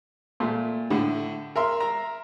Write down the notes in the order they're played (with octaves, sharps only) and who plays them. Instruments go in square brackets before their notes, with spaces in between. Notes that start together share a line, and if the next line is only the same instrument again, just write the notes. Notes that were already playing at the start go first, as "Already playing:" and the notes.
[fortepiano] A#2 A3
[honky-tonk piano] A2 [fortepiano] D3
[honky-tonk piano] A#4 E5 C6
[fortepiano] A#5